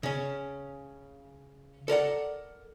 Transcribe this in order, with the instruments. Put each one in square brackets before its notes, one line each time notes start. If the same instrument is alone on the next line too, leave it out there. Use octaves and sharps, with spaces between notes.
[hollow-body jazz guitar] C#3 C#4
A4 A#4 D5 F#5